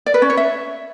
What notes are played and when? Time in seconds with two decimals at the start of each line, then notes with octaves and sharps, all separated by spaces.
0.06 D5
0.14 B4
0.22 C#4
0.30 C#5
0.37 E5